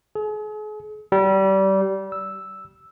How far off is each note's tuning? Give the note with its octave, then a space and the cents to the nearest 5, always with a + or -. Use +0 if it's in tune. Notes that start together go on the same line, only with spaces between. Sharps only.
G#4 +40
G3 -25
E6 +0